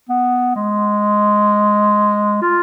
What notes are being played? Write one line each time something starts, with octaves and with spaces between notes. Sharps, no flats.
B3
G#3
F4